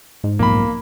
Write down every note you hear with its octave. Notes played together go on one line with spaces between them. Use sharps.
G#2
B1 F2 A#2 A#3 B5